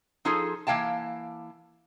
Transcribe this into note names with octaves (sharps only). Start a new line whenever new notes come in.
F3 D#4 F4 G#4 A4
E3 A#3 F5 G5 A5